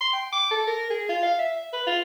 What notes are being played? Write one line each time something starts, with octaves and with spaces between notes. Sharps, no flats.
C6
G5
D6
A4
A#4
G#4
F4
F5
E5
B4
F4